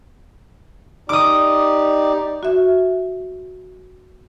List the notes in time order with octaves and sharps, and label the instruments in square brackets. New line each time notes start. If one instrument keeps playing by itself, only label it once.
[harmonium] D#4 G4 D5 [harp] D6 D#6
[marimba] F#4 E5